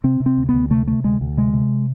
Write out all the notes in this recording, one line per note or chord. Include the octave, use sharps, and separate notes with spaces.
C3 C4
C3
C4
D2
D2 B3
C3 A3
C3 A3
D2 G#3
D2
C3 G#3
C3